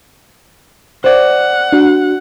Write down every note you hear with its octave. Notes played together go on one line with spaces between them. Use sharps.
C5 D5 F#5
D4 F#4